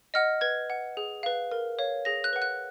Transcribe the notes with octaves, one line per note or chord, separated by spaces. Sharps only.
D#5 F#5 F6
B4 G#6
F#5
G#4
B4 F5
A#4
C#5 F5
G#4 A#6
F#6
B4 F#5
F#6